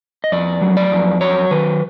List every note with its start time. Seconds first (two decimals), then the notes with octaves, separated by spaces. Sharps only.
0.24 D#5
0.32 F2 D5
0.62 F#3
0.77 D5
0.92 F2
1.21 F#3 C#5
1.51 D#3 B4